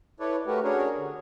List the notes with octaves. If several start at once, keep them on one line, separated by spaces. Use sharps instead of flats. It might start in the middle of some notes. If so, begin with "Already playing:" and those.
E4 A4 B4 C#5 D5
A3 F#4 G4 A#4 B4
C#4 D4 F#4 G#4 A#4 C#5
D3